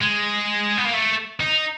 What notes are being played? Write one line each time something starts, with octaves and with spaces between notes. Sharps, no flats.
G#3
B3
A#3
A3
D#4